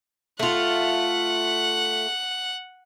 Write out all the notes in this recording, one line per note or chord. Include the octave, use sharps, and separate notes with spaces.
A3 F4 F#5